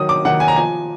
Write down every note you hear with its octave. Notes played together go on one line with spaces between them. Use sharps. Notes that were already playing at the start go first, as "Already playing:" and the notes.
Already playing: D#3 F#3 D#6
D6
D#3 F#5
G#5
A#5
F3 G#5